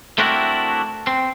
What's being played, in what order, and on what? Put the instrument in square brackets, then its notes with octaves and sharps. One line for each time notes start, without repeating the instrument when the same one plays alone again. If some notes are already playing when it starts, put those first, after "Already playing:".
[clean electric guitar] A3 C4 D4 E4 F#4 A#4
C4